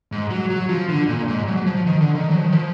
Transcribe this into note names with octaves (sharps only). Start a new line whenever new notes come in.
G#2
F#3
F#3
F3
D3
A#2
G#2
F#3
F3
D#3
D3
D#3
F#3
F3
D#3
F3